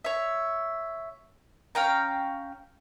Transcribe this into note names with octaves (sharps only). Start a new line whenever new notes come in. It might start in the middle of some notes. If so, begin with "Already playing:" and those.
C#5 E5
C#4 F5 G5 A#5